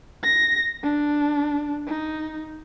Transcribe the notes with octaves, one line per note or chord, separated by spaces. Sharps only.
A#6
D4
D#4